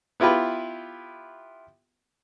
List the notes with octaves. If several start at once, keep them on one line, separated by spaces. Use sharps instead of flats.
B3 E4 F4 G4 B4